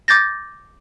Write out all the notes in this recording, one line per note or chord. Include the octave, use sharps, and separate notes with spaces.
D6 G6 A6 A#6